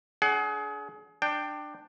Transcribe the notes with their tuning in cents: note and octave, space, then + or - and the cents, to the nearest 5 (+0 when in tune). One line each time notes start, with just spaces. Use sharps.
D4 -30 G#4 +30 F#5 +30
D4 +20 G5 +0